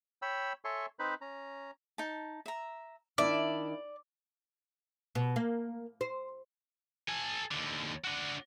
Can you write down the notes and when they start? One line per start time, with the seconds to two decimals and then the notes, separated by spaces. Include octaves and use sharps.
0.22 C#5 G5 B5 E6
0.65 A4 C#5 E5 G#5 C6 C#6
0.99 C4 D#4 B4 C5 B5
1.21 C#4 A#5
1.98 D#4 A5
2.46 E5 A#5
3.18 D#3 D4 E4 D5 E5 A5 D6
5.15 B2
5.36 A#3
6.01 C5
7.09 A4 G#5
7.51 D#2 D3
8.04 D4 F#4